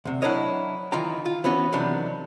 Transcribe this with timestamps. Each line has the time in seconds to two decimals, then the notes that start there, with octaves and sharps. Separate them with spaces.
0.05 D2 C3
0.22 F#3 D4 E4 A#4 C#5 D#5
0.92 D#3 E3 F4 G5 A#5
1.26 F4
1.44 E3 B3 C#4 F#4 C#5
1.72 C3 D#3 E3 F#3 G3 D4